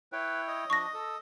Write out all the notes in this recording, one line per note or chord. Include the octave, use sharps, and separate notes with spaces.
E4 B4 C#5 G5
D#5
F3 D4 C#6 A#6
A4